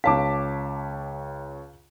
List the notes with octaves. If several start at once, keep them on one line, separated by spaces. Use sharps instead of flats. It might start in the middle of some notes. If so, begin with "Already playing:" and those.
C#2 C#5 F5 A5 D6 B6